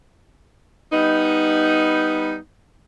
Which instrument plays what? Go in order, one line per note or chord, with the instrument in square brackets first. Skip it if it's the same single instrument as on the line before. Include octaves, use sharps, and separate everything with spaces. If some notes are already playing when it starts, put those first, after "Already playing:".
[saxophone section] G3 B3 D#4